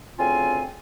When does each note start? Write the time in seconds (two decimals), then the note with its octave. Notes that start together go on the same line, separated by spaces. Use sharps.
0.18 D2 C#3 C4 F4 G#5